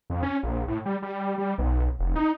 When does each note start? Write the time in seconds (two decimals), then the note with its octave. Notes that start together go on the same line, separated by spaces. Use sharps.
0.10 F2
0.23 C#4
0.43 A#1
0.68 A2
0.85 G3
1.02 G3
1.38 G3
1.58 B1
1.99 F1
2.16 D#4